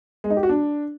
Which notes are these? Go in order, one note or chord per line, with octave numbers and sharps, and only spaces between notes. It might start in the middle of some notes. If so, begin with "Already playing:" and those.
G#3
D#4
G4
F#4
D4